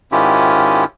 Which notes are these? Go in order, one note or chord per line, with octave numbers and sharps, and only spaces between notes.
G#2 D#3 C#4 E4 F4 G4